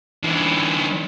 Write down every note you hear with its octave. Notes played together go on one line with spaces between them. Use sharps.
D3 E3